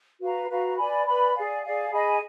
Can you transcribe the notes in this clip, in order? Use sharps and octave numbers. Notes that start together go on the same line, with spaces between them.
F#4 B4 F5 A#5
F#4 B4 F5 A#5
B4 D5 G#5 B5
B4 D5 G#5 B5
G#4 D5 F5 G#5
G#4 D5 F5 G#5
G#4 D#5 G#5 B5